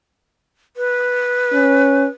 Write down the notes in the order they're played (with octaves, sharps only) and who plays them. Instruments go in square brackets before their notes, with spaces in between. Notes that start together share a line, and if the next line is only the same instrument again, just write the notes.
[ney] B4
[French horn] C#4